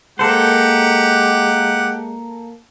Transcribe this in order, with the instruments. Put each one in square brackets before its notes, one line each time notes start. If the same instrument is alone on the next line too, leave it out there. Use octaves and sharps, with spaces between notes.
[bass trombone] G#3 [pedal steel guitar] A#3 A4 C5 [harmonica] G4 F#5